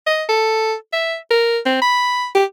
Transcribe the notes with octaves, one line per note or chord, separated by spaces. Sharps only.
D#5
A4
E5
A#4
C4
B5
G4